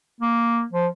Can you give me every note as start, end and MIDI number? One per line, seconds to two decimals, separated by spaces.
0.20 0.64 58
0.73 0.87 53